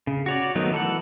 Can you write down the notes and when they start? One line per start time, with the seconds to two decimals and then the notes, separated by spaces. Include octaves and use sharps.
0.07 C#3
0.26 F#4 C#5 D5
0.55 D#3 F#3 A3 B3 D#4
0.72 E3 A4 F#5